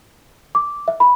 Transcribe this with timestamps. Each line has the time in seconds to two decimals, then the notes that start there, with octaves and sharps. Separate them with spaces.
0.55 D6
0.88 E5
1.00 B5